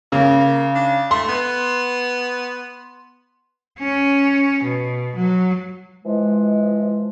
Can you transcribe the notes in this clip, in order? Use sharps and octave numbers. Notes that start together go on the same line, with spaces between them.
C#3 A#3
A#3
D4
A3 C6
B3
C#4
B2
F#3
E3 F3 G#3